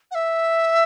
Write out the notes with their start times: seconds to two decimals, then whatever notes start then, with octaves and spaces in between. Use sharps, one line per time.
0.11 F#5
0.14 E5